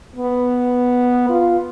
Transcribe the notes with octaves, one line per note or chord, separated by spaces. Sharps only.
B3
F4